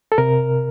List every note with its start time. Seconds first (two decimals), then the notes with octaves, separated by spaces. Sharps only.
0.12 A4
0.18 C3 A#4